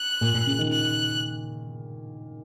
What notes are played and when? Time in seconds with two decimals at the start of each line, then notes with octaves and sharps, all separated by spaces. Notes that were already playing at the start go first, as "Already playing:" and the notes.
Already playing: F#6
0.21 A#2
0.34 A#2
0.47 C#3
0.59 D#3
0.72 F#6